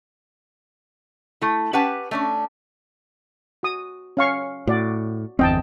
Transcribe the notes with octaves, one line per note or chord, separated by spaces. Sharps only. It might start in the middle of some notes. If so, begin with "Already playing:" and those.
A3 E4
C#4 G4 B4 F#5 G5 A5
A3 C#4 D4
F#4 D#6
C#4 F5 C#6
A2 F#4 D5
G1 E2 C4 D#5 G5 A5